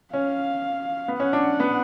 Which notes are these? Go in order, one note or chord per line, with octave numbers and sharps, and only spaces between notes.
C#4 F5
B3
C#4 F#5
D4
B3